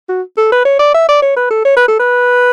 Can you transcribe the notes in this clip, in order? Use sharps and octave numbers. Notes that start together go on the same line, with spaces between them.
F#4
A4
B4
C#5
D5
E5
D5
C#5
B4
A4
C#5
B4
A4
B4